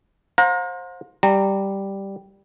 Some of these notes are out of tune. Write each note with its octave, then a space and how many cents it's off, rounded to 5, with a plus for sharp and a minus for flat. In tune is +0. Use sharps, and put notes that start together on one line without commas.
C5 +15 F5 +45 A#5 +0
G3 +0 A#5 -30